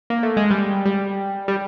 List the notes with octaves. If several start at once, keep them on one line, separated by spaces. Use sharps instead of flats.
A#3
A3
G#3
G3
G3
G3